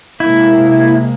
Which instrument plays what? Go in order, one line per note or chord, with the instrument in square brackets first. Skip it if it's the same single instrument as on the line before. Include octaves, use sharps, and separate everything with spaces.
[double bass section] C3 G#3 A#3 [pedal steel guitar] E4